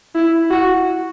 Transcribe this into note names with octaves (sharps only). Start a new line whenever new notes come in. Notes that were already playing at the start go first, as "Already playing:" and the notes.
E4
F#4